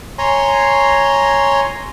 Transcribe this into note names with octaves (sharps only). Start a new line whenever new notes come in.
C#5 G#5 A#5 C6